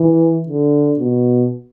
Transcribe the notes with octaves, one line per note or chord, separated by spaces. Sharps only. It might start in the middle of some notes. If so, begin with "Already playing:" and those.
Already playing: E3
D3
B2